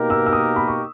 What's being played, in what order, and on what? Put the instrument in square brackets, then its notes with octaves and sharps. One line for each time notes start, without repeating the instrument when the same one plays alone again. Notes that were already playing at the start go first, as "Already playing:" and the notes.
Already playing: [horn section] B2 A#3 D#4 G4 A#4
[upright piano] E6
E6
D#6
B5
C#6